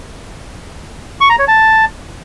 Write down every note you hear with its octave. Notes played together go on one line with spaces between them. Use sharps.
C#6
A#5
C#5
A5